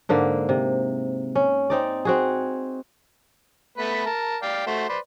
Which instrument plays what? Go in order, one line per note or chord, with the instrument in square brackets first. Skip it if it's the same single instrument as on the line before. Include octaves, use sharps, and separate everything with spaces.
[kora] G#2 D3 A#3
C3
C#4
C4 D#4 D5
C4 F#4 G#4
[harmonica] A3 B3 B4
A#4 A5
D5 F5 G5
A3 F#4 C5
B4 C5 D5